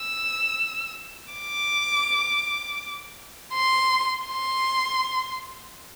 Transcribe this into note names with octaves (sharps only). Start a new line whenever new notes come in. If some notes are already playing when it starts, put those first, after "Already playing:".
Already playing: E6
D6
C6
C6